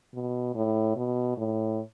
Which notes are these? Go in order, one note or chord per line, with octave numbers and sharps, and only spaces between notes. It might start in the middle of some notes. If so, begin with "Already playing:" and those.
B2
A2
B2
A2